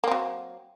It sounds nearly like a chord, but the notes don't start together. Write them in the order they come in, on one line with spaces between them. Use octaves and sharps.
A#3 C4 F#3